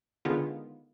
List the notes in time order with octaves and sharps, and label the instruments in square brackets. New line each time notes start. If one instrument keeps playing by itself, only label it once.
[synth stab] D3 D#3 G#3 B3 F4